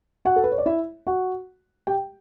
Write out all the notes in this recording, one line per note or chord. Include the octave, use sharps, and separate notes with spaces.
F#4 F#5
A4
B4
C#5
D5
E4 E5
F#4 F#5
G4 G5